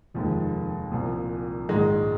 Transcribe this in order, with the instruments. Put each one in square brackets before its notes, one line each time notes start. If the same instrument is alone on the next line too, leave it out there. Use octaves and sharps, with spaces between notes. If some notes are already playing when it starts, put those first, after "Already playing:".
[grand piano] F1 D#2 D#3 G#3 [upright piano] F3
[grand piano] C2 A#2 F3
[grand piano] A#1 G#2 D#3 [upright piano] G#3